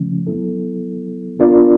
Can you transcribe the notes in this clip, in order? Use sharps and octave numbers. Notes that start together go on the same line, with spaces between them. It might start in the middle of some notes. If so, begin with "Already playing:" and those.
Already playing: C#3 F3 A3 C#4
F#3 B3 E4 A4
B3 D4 F4 A#4 D5